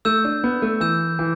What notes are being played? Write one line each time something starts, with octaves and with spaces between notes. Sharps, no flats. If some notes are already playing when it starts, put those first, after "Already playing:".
A3 E6 G6 E7
D4
B3
A3
E3 E6 G6 E7
E3